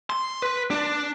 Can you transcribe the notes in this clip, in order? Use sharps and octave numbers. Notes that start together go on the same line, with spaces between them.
C6
B4
D4